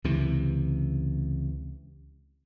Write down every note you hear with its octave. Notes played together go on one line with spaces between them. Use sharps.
C#2 C3 E3